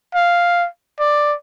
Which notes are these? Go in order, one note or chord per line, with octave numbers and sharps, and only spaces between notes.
F5
D5